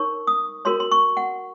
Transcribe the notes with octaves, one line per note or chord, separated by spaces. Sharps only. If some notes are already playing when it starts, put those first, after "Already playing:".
Already playing: D#4 A#4 C#5 C#6
D#6
F#4 A#4 C#5 C6
C6
C#6
F#5